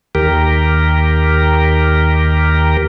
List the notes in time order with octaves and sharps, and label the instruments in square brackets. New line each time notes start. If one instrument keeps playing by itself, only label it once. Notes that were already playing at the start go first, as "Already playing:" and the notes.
[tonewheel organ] D#2 G4 A#4